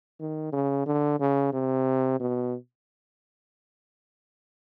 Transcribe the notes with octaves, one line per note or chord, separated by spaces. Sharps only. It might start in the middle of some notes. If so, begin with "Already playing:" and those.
D#3
C#3
D3
C#3
C3
B2